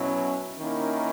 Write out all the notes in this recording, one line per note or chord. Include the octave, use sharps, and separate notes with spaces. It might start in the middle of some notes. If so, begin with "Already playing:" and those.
Already playing: B2 F#3 C#4 E4
D#3 A#3 C#4 E4